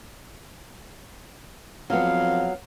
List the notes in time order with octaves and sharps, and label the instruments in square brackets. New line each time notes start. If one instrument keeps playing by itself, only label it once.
[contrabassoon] F2 [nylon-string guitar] F#3 B3 [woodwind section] F5